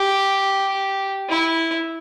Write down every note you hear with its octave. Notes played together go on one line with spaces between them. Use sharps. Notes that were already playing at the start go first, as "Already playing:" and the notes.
Already playing: G4
E4